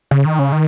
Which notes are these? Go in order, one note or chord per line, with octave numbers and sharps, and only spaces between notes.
C#3
D#3
C#3
D#3